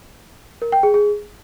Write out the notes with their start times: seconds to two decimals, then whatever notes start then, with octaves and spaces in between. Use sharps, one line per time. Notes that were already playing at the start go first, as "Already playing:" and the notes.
0.62 A#4
0.72 G5
0.83 G#4
0.94 G#4